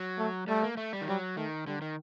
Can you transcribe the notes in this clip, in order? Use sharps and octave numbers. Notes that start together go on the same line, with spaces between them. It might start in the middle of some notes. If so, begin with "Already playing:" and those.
Already playing: F#3
A3
G3 A3
A#3
A3
G3
D#3
F#3 G3
D#3 A3
D3 G3
D#3